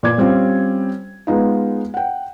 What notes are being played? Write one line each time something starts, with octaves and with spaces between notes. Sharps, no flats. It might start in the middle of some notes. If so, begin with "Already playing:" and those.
A#2 D5 D6 G#6
G3 C4 C#4 F4
G#3 B3 D#4 F4
F#5 G5